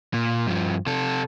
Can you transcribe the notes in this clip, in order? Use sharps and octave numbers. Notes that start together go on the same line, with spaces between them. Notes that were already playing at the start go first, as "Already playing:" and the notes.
A#2
G2 F3
C3 A4